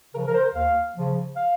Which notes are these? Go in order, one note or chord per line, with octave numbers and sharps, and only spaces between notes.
C#3 F3 A#4
A#4
C5
D#2 F5
C#3 F3
F5